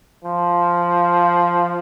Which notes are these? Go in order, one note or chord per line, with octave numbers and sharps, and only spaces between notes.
F3